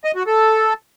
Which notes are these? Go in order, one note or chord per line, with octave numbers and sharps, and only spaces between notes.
D#5
F#4
A4